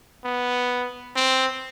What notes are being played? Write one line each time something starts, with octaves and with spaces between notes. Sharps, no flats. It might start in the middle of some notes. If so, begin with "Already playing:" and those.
B3
C4